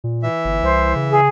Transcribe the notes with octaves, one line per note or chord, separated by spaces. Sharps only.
A#2
E3 E5
G1
C2 C5
C#3
G#4